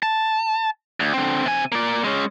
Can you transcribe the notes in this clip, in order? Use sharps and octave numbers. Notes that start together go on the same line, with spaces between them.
A5
D2
D3 C4
C3 G#5
A#3 D5
G#3 C#4